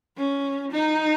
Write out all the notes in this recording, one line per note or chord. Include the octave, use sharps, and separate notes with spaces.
C#4
D#4